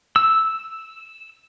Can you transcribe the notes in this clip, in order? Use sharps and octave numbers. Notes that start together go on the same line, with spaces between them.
E6